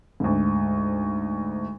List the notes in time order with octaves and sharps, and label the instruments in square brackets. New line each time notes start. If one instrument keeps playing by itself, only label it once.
[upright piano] D2 G#2